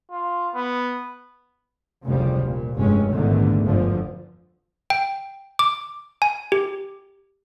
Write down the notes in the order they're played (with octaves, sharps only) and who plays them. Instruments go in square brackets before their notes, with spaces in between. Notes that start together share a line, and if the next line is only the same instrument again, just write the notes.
[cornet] F4
B3
[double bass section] F1 D2 C#3 F3 G3
A#2
F1 G2 G#3 C#4
A#1 E2 G#2 D3 D#3 A3
G1 D3 F3
[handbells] G5
D6
G#5
G4